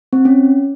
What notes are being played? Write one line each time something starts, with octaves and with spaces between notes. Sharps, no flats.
C4
C#4